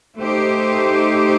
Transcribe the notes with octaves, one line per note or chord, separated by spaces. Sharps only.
A3 D#4 G4 C5